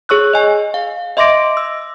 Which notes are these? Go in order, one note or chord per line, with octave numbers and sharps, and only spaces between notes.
G#4 C#5 C#6 E6 F#6
D#5 G#5
F5
D#5 E5 C6 D6 A#6 D7
E6